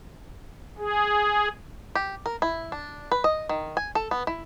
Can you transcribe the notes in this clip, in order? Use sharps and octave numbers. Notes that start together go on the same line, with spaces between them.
G#4
G4
A#4
E4
D4
B4
D#5
D#3
G#5
A4
B3
E4